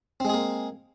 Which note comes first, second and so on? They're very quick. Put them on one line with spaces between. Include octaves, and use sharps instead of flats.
C4 G#3 G#4 A#3